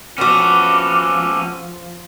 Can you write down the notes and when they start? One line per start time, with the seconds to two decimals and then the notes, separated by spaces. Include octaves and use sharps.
0.18 F3 B3 C#4 F#4 A4 D6